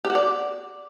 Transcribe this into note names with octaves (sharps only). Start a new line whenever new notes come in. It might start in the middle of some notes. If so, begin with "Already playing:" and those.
G4
F#4
D5